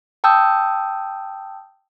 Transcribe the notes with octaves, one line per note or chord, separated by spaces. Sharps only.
G5 A5 D#6 E6 G6